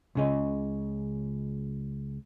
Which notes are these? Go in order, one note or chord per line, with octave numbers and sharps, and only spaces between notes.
C#2 C#3 D#5